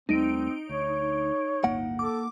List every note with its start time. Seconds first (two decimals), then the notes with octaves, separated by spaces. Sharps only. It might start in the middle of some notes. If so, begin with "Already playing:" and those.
0.09 D#2 G3 A3 C4 D#4 D7
0.69 D2 C#5
1.64 D1 G1 A#3 F#5
1.99 A4 D6